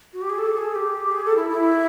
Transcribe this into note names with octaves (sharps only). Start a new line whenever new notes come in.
F#4
G4
G#4
A4
G#4
G4
G#4
A4
E4
E4